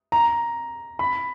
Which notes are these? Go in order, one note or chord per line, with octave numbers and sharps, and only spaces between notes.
A#5
B5